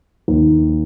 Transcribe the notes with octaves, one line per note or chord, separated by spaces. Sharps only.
D#2